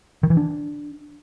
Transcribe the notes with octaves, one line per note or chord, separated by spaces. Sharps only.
D#3
E3
D4